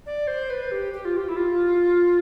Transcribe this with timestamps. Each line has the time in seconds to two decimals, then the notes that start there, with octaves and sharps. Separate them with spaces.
0.06 D5
0.27 C5
0.50 B4
0.72 G4
0.93 G4
1.05 F4
1.17 G4
1.29 E4
1.36 F4